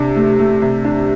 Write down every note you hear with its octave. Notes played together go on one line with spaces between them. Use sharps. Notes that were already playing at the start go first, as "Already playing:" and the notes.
Already playing: C3 D4
A3
A3
C3
D4